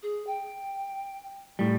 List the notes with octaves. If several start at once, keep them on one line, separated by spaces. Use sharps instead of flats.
G#4
G5
A2 G3